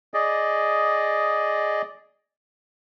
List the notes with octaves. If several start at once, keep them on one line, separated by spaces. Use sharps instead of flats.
G#4 D5 D#5